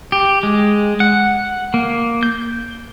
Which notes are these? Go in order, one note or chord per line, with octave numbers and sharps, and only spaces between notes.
G4
G#3
F#5
A#3
G6